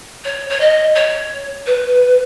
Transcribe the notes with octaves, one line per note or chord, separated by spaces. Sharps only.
C#5
C#5
D#5
C#5
B4